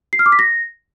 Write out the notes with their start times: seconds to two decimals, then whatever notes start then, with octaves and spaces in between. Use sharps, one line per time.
0.13 C7
0.19 F6
0.26 D6
0.32 B6
0.39 A#6